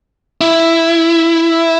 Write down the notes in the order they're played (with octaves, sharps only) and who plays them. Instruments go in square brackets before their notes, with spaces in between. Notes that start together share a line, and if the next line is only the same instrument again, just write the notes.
[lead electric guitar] E4